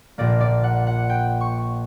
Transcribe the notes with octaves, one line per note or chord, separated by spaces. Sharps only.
A#1 A#2 A#3 D5
D5
F#5
F#5
G5
C#6